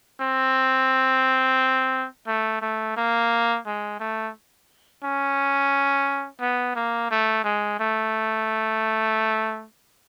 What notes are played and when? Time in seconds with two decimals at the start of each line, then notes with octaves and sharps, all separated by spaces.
0.21 C4
2.27 A3
2.62 A3
2.97 A#3
3.66 G#3
4.00 A3
5.04 C#4
6.41 B3
6.76 A#3
7.11 A3
7.44 G#3
7.80 A3